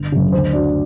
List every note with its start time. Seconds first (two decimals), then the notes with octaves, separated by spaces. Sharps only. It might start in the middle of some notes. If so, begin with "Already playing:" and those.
Already playing: G1
0.12 F#2 C#3
0.32 D2 C5
0.53 D3 F#3 D5